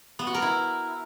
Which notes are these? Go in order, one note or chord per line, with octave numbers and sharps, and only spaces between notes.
B3
F#4
A#4
E4